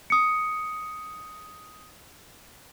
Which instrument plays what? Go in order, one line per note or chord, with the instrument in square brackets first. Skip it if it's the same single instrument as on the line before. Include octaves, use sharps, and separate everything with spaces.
[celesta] D#6 C#7